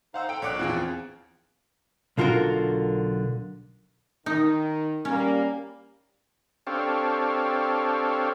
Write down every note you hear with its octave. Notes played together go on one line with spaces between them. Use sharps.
D#4 C5 F5 F#5 E6
A4 G5 D7
A#1 C#5 F#5 G5 D6 F#6
E2 F3 C4 F4 G#4
B1 D3 F4 F#4 A#4
D#3 D#4
G3 A#3 C#4
C4 D4 G4 A4 C#5 F5